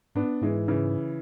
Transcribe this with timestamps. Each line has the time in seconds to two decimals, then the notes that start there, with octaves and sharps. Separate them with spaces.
0.15 G#2 B3 D4
0.41 G#2 E3 G#3
0.68 C#3 E3